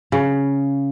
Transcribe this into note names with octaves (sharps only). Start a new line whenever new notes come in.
C#3